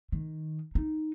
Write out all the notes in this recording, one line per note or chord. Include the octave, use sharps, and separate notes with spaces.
D#3
D#4